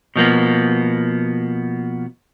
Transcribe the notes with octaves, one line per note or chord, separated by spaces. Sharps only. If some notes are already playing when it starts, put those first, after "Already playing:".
B2 F3 A#3 B3